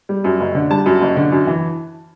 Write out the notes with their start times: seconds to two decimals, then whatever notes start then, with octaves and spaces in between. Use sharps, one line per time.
0.09 G3
0.24 F#2
0.40 F#1
0.55 D3
0.70 G3 A5
0.86 F#2
1.01 F#1
1.16 D3
1.32 F#2
1.47 E3